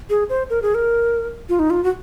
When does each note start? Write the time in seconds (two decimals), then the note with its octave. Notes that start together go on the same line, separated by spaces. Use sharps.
0.10 G#4
0.29 C5
0.50 A#4
0.62 G#4
0.75 A#4
1.49 F4
1.59 D#4
1.70 F4
1.84 F#4